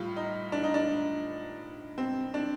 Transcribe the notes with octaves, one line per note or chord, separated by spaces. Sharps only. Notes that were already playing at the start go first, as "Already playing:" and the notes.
Already playing: A2 G3 F4
D#4
D4
D#4
D4
C4
D4